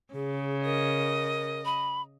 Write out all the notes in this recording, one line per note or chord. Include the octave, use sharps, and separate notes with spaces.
C#3 G#4
A#4 D#5
B5